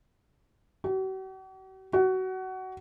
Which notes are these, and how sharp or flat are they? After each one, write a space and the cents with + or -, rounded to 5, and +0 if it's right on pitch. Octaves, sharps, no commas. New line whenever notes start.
F#4 +45
F#4 +20